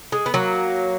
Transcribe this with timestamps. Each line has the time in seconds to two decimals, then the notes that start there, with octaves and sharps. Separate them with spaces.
0.12 G#3
0.26 B3
0.34 F#3 A#3